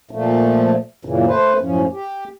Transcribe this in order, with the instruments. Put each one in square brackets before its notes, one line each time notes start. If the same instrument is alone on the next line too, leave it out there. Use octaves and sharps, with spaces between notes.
[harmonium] A#2 F3 A3
F#2 A#2 C#3 E3
A3 B4 C5
F#2 A2 F3 C#4
G4